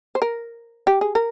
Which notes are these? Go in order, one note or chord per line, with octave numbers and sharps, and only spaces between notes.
C5
A#4
G4
G#4
A#4